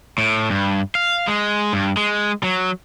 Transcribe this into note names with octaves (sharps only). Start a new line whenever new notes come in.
A2
G2
F5
G#3
G2
G#3
F#3